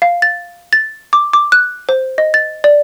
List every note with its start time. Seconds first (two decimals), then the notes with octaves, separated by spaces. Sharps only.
0.02 F5
0.22 A6
0.73 A6
1.13 D6
1.33 D6
1.52 F#6
1.89 C5
2.18 D#5
2.34 A6
2.64 D5